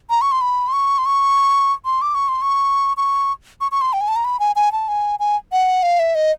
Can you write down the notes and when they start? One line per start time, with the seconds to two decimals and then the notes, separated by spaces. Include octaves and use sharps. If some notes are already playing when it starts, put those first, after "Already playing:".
0.10 A#5
0.21 C#6
0.31 C6
0.41 B5
0.68 C6
0.73 C#6
0.98 C6
1.06 C#6
1.85 C6
2.02 D6
2.14 C#6
2.28 C6
2.42 C#6
2.97 C#6
3.61 C#6
3.71 C#6
3.81 C6
3.93 G5
4.01 G#5
4.08 A5
4.16 A#5
4.24 B5
4.39 G#5
4.56 G#5
4.72 A5
4.88 G#5
5.19 G#5
5.52 F#5
5.83 F5
5.99 E5
6.15 D#5